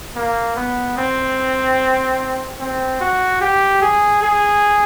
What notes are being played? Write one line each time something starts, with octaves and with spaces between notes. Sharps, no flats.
A#3
B3
C4
C4
F#4
G4
G#4
G#4